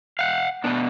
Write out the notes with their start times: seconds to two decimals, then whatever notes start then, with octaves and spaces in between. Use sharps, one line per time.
0.19 F5 F#5
0.64 B2 B3 D4